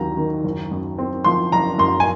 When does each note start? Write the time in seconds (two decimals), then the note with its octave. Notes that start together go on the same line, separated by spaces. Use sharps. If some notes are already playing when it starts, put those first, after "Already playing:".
Already playing: D#2 D#3 F#3 C4 A#5
0.17 D#3
0.44 F#1
0.71 F#2
0.98 C4
1.24 F3 C6
1.52 F#1 A#5
1.78 F#2 C6
2.00 G#5